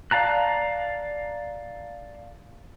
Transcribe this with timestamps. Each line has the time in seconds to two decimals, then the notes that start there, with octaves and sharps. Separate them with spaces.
0.11 D5 F5 A5 A#5 F#6